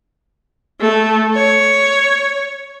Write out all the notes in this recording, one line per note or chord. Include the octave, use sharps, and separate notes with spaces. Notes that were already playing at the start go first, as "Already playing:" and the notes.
A3
C#5